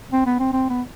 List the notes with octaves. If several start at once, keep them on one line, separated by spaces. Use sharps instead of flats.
C4
B3
C4
C4
B3